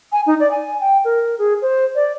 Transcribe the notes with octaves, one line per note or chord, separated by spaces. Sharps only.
G#5
D#4
D5
G#5
G5
A#4
G#4
C5
D5